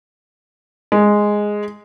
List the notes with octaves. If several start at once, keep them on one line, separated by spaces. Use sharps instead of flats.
G#3